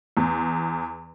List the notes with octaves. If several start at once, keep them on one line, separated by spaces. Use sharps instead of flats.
E2